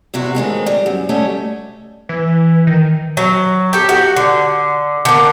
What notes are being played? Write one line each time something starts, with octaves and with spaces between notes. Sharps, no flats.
E2 C3 E4 F#4
A2 D#3 G#3 C4
G3
F#2
G3 A3 C#4 C#5 D#5
E3
D#3
F#3
G4 A4
F#4
D3
D3 A#3